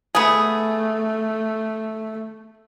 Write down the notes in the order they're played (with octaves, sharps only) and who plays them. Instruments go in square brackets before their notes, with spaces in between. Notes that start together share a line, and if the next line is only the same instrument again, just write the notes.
[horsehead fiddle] A3 [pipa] B3 G#4